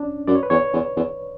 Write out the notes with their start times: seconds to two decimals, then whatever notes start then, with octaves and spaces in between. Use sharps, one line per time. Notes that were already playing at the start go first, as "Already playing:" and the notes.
Already playing: C#4 D4
0.27 F#2 D5
0.35 C#5
0.43 B4
0.50 E2 C#5
0.73 E2
0.96 E2